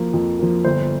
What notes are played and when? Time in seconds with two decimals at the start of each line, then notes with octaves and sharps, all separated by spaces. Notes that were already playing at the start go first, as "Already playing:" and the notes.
Already playing: F3 A#3
0.14 F2
0.39 F3 A#3
0.65 G1 C5